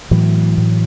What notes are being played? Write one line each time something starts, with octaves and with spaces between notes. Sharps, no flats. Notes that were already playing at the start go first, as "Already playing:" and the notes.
A2 E3 F#3
A2